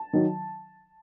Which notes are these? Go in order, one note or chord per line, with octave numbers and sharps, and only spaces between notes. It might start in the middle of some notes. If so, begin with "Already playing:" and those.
Already playing: A5
D#3 F#3